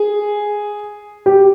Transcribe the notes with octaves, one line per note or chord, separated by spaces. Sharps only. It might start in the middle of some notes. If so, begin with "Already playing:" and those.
Already playing: G#4
G4